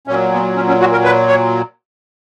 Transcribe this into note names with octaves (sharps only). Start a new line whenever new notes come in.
A#2 F#3 C#4
B3
C#4
C#4
F#4
A#4
B4
C#5